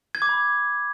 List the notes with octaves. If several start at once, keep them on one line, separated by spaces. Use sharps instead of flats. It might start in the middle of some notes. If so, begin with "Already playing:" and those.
G#6
D6
B5